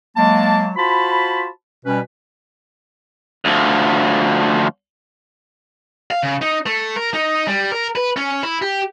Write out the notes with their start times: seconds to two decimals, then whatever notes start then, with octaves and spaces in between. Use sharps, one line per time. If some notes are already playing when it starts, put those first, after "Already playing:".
0.17 F#3 G#3 A#3 A5
0.77 F4 F#4 C5 A5 B5
1.86 B2 G3 C#4 B4
3.45 D2 F3
6.11 F5
6.23 C#3
6.42 D#4
6.66 A3
6.96 A#4
7.14 D#4
7.48 G3
7.72 A#4
7.96 B4
8.17 C#4
8.43 E4
8.62 G4